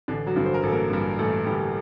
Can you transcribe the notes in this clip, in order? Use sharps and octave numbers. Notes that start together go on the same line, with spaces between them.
A1 D3 D4
F#3 F#4
G2 D3
C5
A#4
A1 A4
A#3 A#4
G2 D3
A1 A3 A4
G2 D3 G3 G4